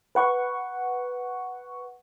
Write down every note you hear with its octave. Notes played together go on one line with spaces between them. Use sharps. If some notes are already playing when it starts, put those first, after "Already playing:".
B4 F#5 C#6